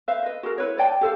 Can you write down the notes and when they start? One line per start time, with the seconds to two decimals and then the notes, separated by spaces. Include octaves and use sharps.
0.08 B4 C5 E5 F5
0.23 B4 D#5
0.43 F#4 G#4 A#4
0.58 E4 B4 C#5
0.77 C#5 D5 G5 A5
1.01 G4 A4 C5 F5